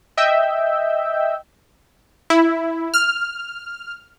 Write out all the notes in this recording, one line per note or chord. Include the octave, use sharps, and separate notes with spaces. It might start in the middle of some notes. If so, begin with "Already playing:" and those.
D#5 E5 G5 E6 G6
E4
F6